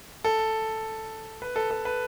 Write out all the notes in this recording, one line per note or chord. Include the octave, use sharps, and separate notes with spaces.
A4
B4
A4
A4
B4